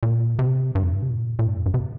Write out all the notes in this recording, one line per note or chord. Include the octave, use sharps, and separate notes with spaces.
A#2
C3
G2
F2
G2
C3
A#2
A#2
G2
F2
G2
C3